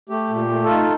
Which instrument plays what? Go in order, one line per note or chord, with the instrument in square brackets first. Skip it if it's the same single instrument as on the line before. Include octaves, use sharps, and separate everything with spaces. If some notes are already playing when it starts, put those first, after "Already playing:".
[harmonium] A3 G4
A#2
G4
A3
F4 A4
D#4